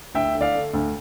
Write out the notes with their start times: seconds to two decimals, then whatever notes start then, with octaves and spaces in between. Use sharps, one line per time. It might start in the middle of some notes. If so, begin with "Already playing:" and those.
0.14 D2 E5 G5
0.35 D3
0.41 D5 F5
0.54 A3
0.74 D2